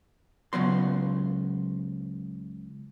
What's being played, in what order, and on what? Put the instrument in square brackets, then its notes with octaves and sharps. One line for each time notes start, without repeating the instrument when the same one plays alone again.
[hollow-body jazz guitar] C#2 F#3 B3 C6